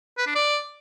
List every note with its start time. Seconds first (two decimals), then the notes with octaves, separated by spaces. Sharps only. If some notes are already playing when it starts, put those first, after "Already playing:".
0.18 B4
0.27 D4
0.35 D5